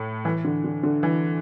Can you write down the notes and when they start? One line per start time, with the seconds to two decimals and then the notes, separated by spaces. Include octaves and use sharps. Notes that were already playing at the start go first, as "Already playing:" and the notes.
Already playing: A2
0.25 E3
0.44 D3
0.64 D3
0.83 D3
1.03 E3